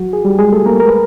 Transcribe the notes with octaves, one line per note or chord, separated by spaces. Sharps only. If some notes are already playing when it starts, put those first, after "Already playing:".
Already playing: F#3 F#4
G#4
G3 G4
G#3 G#4
A3 A4
A#3 A#4
A#4
B4